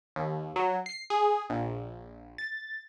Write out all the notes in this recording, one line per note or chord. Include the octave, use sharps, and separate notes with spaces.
D#2
F#3
C7
G#4
A#1
A6